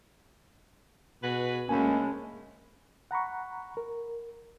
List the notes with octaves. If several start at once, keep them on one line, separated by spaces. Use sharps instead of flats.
B2 F#4 G#4 B4
D2 G#3 A#3 C#4 G#5 A5 B5
F#5 A#5 B5 C#6
A#4